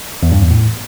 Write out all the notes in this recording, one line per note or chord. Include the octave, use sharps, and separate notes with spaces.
E2
G2
E2
A2